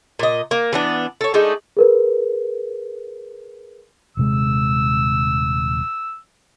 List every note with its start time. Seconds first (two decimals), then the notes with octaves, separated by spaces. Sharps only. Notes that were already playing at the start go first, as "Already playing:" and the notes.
0.19 A#2 D#5
0.51 A#3
0.73 E3 B3 D4
1.21 A4 C#5
1.34 G#3 A3 D4 D#4
1.77 G#4 A#4 B4
4.17 D#1 C3 G#3 E6